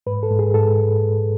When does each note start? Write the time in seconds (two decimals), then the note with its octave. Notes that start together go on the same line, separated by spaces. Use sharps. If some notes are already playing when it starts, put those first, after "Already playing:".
0.07 G#2 B4
0.23 A4
0.31 G#2
0.39 G#4
0.54 G#2 A4